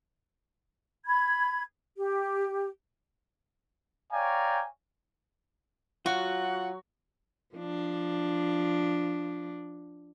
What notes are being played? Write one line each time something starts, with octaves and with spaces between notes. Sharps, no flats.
B5 G#6
G4
C#5 D5 F5 G5 G#5 A#5
F#3 F4 F#4 F#5
F3 D4